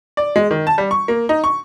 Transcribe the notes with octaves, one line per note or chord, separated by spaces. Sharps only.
D5
G#3
D#3
A5
G3
C#6
A#3
D#4
C#6